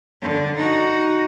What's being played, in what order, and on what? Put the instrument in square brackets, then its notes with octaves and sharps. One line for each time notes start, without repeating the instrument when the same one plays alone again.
[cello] D3
D#4 F#4